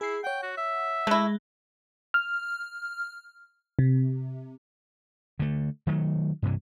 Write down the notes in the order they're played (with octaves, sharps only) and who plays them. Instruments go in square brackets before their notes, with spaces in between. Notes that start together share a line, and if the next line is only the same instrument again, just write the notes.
[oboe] E4 [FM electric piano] G#4 C7
[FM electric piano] C#5 F#5 [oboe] G5
[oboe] F#4
E5
[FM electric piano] G#3 F#6 A#6 [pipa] A3 E4
[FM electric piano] F6
C3
[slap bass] D3 A3
D#3 F#3 A3
G2 C3 E3